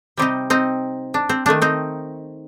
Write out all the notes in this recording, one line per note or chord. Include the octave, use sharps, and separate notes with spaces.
C3 G3 C4 D#4 G4
C4 D#4
D4
C4
D#3 A3 C4 D4
C4 D#4